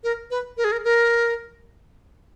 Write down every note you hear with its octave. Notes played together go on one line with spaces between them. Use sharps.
A#4
B4
A#4
G#4
A#4
A#4